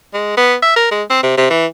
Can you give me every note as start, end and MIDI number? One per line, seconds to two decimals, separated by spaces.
0.14 0.37 56
0.37 0.55 59
0.63 0.74 76
0.76 0.87 70
0.91 1.03 56
1.10 1.20 60
1.23 1.36 48
1.38 1.50 48
1.50 1.66 52